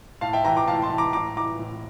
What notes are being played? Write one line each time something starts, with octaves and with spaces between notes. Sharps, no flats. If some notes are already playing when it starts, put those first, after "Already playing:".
A2 F5 A5
E5 G5
E3 G5 A#5
A#5 D6
A2 F5 A5
A5 C6
E3
A#5 D6
A2 A#5 D6
E3 A#5 D6
A2